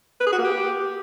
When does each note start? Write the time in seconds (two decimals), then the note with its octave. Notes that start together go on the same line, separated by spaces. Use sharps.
0.21 B4
0.27 G#4
0.32 F#4
0.38 A#3
0.44 G4